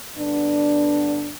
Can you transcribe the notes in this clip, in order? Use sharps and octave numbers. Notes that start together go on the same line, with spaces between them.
G2 D3 B3 D4